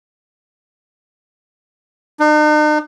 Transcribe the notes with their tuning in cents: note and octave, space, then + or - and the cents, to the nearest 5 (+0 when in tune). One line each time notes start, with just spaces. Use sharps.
D#4 -45